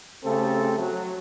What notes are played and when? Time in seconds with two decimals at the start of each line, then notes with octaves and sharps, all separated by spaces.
0.24 C#3 A3 C4 G4 A4
0.79 F#3